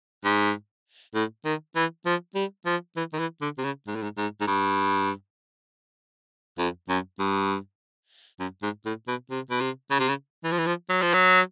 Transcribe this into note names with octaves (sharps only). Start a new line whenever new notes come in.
G#2
A2
D#3
E3
F3
G3
F3
E3
D#3
E3
D3
C3
C#3
G#2
A2
G#2
G#2
G#2
G2
F2
F#2
G2
F#2
G#2
A2
B2
C3
B2
C3
C#3
C3
C#3
E3
F3
E3
F3
F#3
F3
F#3